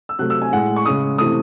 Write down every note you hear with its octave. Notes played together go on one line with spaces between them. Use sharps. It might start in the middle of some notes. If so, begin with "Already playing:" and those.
E6
C3 F#3 A3 F#6
E6
G#5
A2 G#3 F#5
C#6
C#3 G#3 D#6
C3 E3 A3 D#6